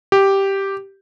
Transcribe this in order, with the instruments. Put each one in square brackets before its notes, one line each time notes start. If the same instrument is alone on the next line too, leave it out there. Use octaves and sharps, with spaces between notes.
[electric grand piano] G4